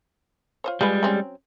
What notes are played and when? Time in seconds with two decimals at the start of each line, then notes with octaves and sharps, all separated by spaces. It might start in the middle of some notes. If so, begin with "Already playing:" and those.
0.64 F4 C5 C#5
0.81 G3 G#3 F4 G#4 B4
1.03 F#3 C4 C#4